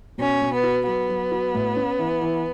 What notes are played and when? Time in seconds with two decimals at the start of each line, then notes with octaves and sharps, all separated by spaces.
0.18 B2 C#4
0.41 B2
0.52 B3
0.63 F#4
0.86 F#3 B3
1.09 F#3
1.31 F#4
1.54 A2
1.76 C#4
1.99 E3
2.21 E3